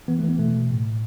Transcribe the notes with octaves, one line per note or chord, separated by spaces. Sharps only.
E3 B3
A3
E3
B3
B2 A3
B2
A2
A2